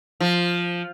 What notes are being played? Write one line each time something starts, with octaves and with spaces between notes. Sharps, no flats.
F3